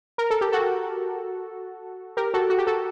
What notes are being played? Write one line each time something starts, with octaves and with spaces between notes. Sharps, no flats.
A#4
A4
G4
F#4 A4
G4 A#4
F#4 A4
F#4
G4
F#4 A4